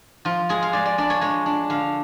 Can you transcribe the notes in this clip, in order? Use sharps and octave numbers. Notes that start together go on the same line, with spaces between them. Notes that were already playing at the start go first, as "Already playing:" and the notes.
F3 F4
G#3 G#4
F5
G#3 D5
D5
D4 D5
C#5
G#3 C#5
D4
D3 F5